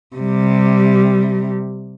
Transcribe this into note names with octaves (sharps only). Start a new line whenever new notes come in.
C3 G3